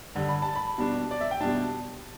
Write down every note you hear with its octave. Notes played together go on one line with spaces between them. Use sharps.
G2 D3 G3
B5
A5
B5
B2 G3 D4
D5
E5
G5
B2 G3 D4 A5